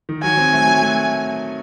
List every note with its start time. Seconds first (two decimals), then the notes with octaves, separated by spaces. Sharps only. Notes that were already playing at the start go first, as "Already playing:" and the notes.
0.09 D#3
0.23 F#3 G#5
0.37 C4
0.53 A3
0.67 F#3
0.82 A3